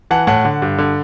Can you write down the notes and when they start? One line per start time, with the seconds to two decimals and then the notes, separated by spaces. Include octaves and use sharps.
0.11 E3 F#5 A5
0.27 A2 F#5 A5
0.45 D3
0.62 G2
0.78 D3